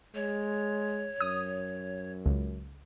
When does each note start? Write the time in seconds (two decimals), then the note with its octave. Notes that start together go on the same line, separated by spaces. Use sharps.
0.15 G#3 C#5
1.21 F#2 D#6
2.26 C#2